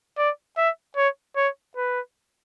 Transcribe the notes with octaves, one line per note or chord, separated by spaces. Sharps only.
D5
E5
C#5
C#5
B4